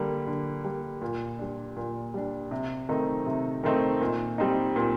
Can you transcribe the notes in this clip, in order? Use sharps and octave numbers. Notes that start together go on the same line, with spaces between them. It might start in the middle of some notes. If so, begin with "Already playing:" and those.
Already playing: D3 G3 A#3
D3
G3 A#3
A#2
G3 D4
A#2
G3 D4
C3
D#3 A3 C4 D#4
C3
D#3 A3 C4 D#4
A#2
G3 C4 D#4
A#2